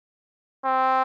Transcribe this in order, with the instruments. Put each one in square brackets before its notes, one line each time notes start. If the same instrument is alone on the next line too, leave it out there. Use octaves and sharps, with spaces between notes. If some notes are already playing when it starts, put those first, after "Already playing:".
[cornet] C4